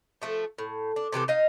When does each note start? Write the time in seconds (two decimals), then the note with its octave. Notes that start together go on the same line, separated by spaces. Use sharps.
0.22 F3 A3 A4
0.58 A2
0.96 D4
1.12 C3 E3 G4 A4
1.28 D#4 D#5 F5